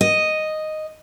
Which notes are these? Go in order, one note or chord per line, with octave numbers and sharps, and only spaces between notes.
D#5